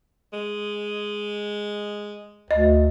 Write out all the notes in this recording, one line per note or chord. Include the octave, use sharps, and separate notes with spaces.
G#3
D2 D#5